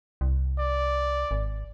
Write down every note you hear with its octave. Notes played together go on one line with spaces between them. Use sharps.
C2
D5
G#1